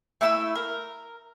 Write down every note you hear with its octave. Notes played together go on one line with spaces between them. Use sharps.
A3 E4 B5 E6
A#4